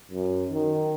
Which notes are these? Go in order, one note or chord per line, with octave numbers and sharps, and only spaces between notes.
F#2
D#3